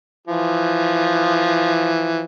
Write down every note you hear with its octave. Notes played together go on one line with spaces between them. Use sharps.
E3 F3